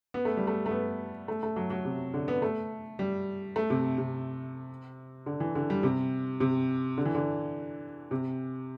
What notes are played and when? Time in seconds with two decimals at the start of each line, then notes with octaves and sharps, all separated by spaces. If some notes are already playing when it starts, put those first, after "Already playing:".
0.14 B3
0.25 A3
0.37 G3
0.47 A3
0.66 A3
0.71 B3
1.28 A3
1.43 A3
1.56 F#3
1.70 F#3
1.85 C3
2.14 D3
2.28 B3
2.42 A3
2.99 G3
3.56 A3
3.70 C3
3.98 C3
5.26 D3
5.40 E3
5.55 D3
5.70 G3
5.83 C3
6.40 C3
6.98 D3
7.05 E3
7.15 D3
8.11 C3